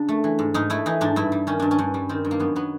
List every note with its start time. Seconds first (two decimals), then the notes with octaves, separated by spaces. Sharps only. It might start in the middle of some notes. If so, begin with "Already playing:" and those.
Already playing: C#3 D4
0.09 A3
0.24 E3
0.39 G#2
0.54 G#2 D#4
0.70 A3 E4
0.86 E3 D#4
1.01 G#2 D4
1.16 G2 E4
1.32 G3
1.47 D#3 C#4
1.60 G2 D4
1.71 C#4
1.79 G2
1.94 G3
2.09 D#3 C4
2.25 G2
2.31 A#3
2.40 F#2 B3
2.56 F#3 B3